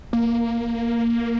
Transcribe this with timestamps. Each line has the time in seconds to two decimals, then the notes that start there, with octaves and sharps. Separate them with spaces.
0.13 A#3